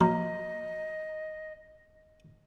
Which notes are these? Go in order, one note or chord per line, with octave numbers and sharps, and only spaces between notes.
F3 F#3 A#3 D#5 A#5